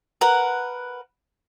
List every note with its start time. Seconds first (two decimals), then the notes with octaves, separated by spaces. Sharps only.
0.21 A#4 B4 F#5